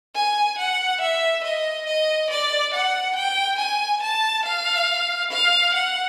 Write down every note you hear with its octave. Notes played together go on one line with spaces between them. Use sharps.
G#5
F#5
E5
D#5
D#5
D5
F#5
G5
G#5
A5
F5
F5
F#5